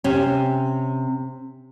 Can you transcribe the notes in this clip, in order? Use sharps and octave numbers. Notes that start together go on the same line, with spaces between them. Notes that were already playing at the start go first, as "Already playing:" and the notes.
C3 C#4